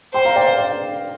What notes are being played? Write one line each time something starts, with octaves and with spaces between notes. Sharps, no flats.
C5 G5 C6
F5 A#5
D5 G5
F5
D5